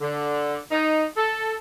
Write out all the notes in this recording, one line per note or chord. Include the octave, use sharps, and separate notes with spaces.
D3
D#4
A4